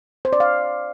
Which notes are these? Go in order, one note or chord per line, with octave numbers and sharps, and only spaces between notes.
C5
D5
F5